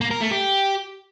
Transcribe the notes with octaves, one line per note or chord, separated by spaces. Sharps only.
A#3
A#4
A3
G4